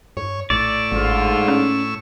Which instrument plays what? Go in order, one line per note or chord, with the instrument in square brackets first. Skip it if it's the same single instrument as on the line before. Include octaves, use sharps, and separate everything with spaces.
[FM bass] G2 [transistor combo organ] C#5
[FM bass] A#1 [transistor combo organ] A2 C#6 E6 [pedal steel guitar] D5
[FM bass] G#1 [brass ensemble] G#2 D3 F4
[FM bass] C#4